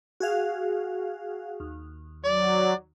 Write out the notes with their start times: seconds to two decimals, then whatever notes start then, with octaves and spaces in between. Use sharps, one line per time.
0.20 F#4 G#4 F5
1.60 D#2
2.25 F#3 D5